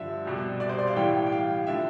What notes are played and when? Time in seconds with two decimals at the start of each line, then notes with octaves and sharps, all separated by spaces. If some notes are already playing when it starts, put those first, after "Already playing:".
Already playing: G2 D3 F3 E5
0.25 C2 B2 G3
0.60 D5
0.69 C5
0.79 D5
0.87 F5
0.96 A2 E3 G3 G5
1.27 G5
1.32 F5
1.67 D3 F3 E5